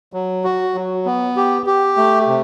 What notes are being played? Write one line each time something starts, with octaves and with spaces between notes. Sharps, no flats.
F#3
F#4
F#3
B3
G4
G4
A3
C3